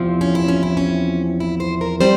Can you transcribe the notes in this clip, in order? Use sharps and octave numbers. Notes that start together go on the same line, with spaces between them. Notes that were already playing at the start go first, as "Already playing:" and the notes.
Already playing: E2 C3 F3 C4
C#4
E4
C#4
E4
C#4
E4
C5
A#4
G3 C4 C5